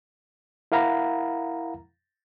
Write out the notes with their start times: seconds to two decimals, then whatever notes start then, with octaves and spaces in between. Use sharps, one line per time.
0.72 E4 A#4 F5 F#5 A#5 B5